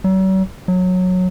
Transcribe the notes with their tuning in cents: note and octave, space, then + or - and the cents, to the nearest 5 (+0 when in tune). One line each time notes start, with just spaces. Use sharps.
F#3 +45
F#3 -15